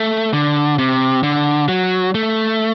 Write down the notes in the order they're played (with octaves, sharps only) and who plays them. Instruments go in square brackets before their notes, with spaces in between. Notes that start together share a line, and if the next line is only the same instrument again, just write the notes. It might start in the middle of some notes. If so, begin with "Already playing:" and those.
Already playing: [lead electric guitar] A3
D3
C3
D3
F#3
A3